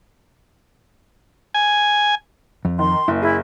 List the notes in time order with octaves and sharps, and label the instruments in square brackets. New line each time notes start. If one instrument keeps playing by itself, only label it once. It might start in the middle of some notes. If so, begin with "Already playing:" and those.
[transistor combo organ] G#5
[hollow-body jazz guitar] F2
[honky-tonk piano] D#3 [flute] C6
[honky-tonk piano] F#1 [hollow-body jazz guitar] E4
[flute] E4 [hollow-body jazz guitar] G#4